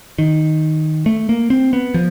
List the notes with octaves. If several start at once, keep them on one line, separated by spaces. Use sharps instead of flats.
D#3
A3
A#3
C4
B3
F3